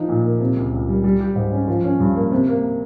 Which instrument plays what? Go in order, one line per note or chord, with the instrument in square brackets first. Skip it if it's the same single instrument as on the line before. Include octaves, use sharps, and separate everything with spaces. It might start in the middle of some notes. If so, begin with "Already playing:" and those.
Already playing: [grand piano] F3 D#4
A#2
A#3
C3
C#2
C#2
G3
G3
G4
G#2
C#4
F3
C#4
G2
A#3
C3
A#3